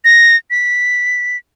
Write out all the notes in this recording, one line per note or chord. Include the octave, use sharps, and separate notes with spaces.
A#6
B6